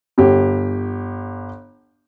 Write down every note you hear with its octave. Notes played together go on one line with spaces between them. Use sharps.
G1 G4